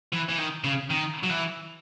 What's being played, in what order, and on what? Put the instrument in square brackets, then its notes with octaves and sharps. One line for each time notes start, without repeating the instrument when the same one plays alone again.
[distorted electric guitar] E3
E3
D#3
C#3
D#3
F#3
E3